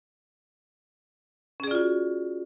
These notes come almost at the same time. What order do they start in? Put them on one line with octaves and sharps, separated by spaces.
C#4 G#4 D5 F4 F#4